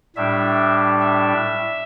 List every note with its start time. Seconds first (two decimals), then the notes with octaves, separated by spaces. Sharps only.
0.16 A2 G3 D4 E5
1.00 E5